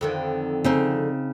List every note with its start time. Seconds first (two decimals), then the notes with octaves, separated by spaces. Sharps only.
0.01 F2 D3 D#3
0.64 C#3 C4 D#4